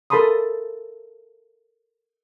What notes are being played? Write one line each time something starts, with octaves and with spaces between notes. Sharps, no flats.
A4 A#4 A5 B5 C6 D#6